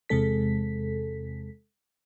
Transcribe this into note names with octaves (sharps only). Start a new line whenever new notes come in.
E2 C3 G#3 A4 B6